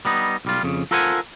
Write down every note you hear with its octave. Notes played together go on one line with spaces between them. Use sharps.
G3 B3 D#4
B1 G3 F4
F2 C#3
F4 A4 A#4 C5 F#5 G#5